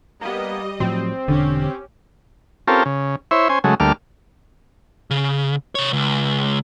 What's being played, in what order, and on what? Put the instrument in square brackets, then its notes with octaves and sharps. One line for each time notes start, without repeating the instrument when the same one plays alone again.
[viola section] G3 D#5 [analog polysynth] A#3 B3
[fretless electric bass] A2 F3 F#3 [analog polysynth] C4
[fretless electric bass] E1 D4 [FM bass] D3 [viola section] C#4 G4
[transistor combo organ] C4 C#4 F4 G4 A4 A#4
C#3
E4 C5 C#5 E5
C#4 C5 G#5
C#3 F#3 G#3 A3
D2 G3 A3 A#3 D6 F6
[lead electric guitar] C#3
C3 C#5
C#2